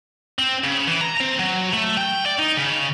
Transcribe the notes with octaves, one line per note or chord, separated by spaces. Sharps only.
C4
C#3
E3
A#5
C4
F#3
A3
G5
D5
D#4
C#3